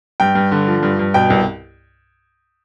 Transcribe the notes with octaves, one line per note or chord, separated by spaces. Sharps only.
G2 G5
G2
D3
F3
G2
G2
B2 G5
C2